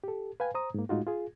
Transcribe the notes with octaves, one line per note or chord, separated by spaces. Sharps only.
G4 A4
B4 F5 G5 G#5
C5 A#5 D#6
G#2 A#3
A2 G#3 D#4 F4 F#4
F4 G#4